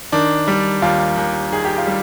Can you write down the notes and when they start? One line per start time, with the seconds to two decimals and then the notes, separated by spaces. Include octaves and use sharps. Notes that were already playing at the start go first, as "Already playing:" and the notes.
0.12 D#3 D4
0.48 G3
0.82 D#2 F4
1.17 D#2
1.52 D#3 G#4
1.65 G4
1.78 F4
1.87 G3